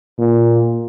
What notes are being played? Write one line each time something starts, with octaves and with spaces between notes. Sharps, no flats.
A#2